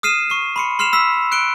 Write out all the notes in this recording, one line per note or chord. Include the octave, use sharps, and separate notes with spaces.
D#6 F6 C7 D#7 E7
C#6 C7
B5 C6 C#7
C6 F6 C7 E7 F7
B5 E6 B6
F#6 C#7 D7 G7